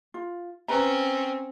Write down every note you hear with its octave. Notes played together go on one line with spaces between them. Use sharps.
F4
C4 C#4 B4 A#5